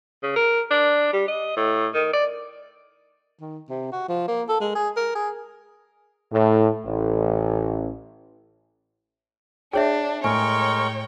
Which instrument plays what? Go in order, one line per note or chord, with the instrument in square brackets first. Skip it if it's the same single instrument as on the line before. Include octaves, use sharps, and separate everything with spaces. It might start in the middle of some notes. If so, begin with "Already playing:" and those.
[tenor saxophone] C#3
A#4
D4
G3
D#5
A2
D#3
D5
D#3
C3
F#4
F3
A#3
A4
G#3
G#4
A#4
G#4
[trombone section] A2
A1
[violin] D4 [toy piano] G#4 C#5 E5 [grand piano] G5
[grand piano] A2 [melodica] G#3 A#4 C#6 [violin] C#5 G5 [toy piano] G#5